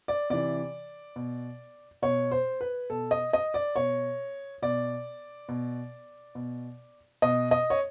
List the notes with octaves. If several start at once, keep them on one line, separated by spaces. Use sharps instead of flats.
D5
C3 E3 D5
B2
B2 C#5
C5
B4
B2 A4
D#5
D#5
D5
B2 C#5
B2 D5
B2
B2
B2 D#5
D#5
C#5